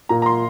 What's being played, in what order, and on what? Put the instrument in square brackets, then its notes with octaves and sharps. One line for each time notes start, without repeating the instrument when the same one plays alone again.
[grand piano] A#2 [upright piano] A#5
[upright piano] A#5
C6